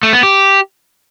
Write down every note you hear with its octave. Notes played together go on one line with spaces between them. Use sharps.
A3
B3
G4